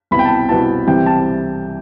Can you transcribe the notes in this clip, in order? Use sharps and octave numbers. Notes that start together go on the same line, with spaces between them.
C2 B2 B3 E4 B5
G5
A5
C2 B2 B3 E4 A5
C2 C3 E3 G3 G5
A5